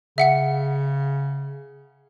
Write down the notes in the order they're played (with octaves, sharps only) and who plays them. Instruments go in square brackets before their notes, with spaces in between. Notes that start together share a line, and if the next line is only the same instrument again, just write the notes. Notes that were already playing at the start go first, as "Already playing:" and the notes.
[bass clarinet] C#3 [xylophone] E5 F#5 C#7